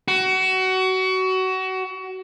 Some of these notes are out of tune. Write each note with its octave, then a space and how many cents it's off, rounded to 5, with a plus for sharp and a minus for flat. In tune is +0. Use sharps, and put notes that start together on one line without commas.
F#4 +25